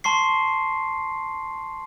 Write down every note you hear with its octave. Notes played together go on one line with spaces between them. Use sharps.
A5 C6 C#6 C7